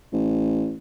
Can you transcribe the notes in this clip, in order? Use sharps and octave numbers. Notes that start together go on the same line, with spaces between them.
A1